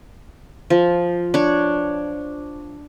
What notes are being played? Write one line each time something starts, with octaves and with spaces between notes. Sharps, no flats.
F3
D4 C#5